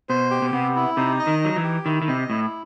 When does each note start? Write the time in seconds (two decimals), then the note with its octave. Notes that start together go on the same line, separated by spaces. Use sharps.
0.09 B2 C5
0.31 G4
0.42 B2
0.53 C3 B3
0.75 E4
0.97 C3 D#4
1.19 D#5
1.27 D#3
1.41 F#3 D#4
1.56 E3
1.63 G4
1.85 D#3 E4
2.02 D#3
2.08 C3 D#5
2.30 A2 E4